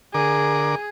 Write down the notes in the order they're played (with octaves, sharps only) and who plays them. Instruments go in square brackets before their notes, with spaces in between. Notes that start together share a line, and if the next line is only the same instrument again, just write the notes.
[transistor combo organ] D3 A#4 D6 [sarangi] G#4